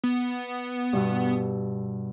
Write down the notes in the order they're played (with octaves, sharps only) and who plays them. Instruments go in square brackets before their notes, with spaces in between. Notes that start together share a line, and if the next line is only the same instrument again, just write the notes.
[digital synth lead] B3
[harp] G2 B2 E6